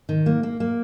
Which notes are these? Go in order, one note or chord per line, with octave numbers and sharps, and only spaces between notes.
D#3
A#3
A#3
A#3